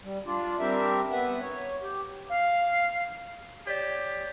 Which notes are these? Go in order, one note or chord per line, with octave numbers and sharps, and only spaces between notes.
G3
D4 F4 D5
G3 C4 D4 G4 A#4 E5
B3 B4 E5 F#5
C#5
G4
F5
G4 C#5 D5